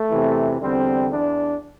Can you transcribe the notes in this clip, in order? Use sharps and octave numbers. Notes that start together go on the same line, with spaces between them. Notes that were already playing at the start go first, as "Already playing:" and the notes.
Already playing: A3
E2 C3 E3
E2 D3 G3 C4
E2 D4